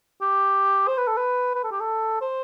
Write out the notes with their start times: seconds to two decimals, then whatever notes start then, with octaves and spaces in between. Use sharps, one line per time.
0.22 G4
0.88 C5
0.98 B4
1.08 A4
1.17 B4
1.55 B4
1.64 A4
1.72 G4
1.81 A4
2.21 C5